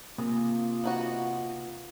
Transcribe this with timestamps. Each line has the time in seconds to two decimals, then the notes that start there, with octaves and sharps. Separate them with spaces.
0.18 C3 A#3 F4 G#4
0.84 B3 D#4 F#4